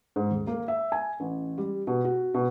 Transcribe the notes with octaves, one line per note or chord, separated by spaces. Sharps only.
G#2
D#1
A#3
E5
G#5
A1
G3
B2
F#4
B2